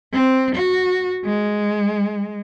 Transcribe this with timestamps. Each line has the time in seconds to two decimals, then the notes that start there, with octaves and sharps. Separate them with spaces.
0.13 C4
0.55 F#4
1.25 G#3